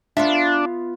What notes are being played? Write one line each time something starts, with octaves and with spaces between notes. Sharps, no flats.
B3 D4 F4 E5